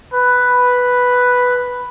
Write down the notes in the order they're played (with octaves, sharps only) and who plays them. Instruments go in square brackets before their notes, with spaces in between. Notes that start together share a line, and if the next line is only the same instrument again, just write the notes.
[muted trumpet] B4